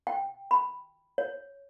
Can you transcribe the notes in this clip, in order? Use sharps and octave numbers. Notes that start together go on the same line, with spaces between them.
G5
B5
C#5